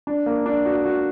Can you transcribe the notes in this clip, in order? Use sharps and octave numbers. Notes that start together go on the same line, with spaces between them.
D4
A#3
D4
F#4
F#4